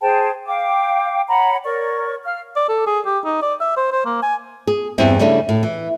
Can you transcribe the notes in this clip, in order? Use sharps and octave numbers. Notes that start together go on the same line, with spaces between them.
G#4 C5 G5 A5
F5 G5 D6
C#5 F#5 A#5 B5
A#4 C#5 D5 C#6
F5 F6
D5
A4
G#4
G4
D#4
D5
E5
C5
C5
A#3
G#5
G#4
E2 G2 E3 C4
C#3 G3 A3 C#4 D4 E4
A2
E3